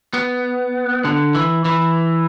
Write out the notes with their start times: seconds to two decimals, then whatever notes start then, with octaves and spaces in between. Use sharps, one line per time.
0.14 B3
1.05 D3
1.35 E3
1.65 E3